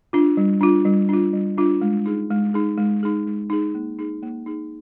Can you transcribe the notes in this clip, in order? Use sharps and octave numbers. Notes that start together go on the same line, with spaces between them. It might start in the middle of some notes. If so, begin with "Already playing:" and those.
D4 F4
G3
D4 F4
G3
D4 F4
G3
D4 F4
G#3
D#4 G#4
G#3
D#4 G#4
G#3
D#4 G#4
G#3
D#4 G#4
A#3
D#4 G#4
A#3
D#4 G#4